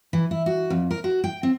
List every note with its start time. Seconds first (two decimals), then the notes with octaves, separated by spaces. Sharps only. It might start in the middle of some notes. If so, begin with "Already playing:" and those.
0.13 E3
0.31 E4
0.46 F#4
0.70 F2
0.91 A#4
1.04 F#4
1.24 G5
1.43 C4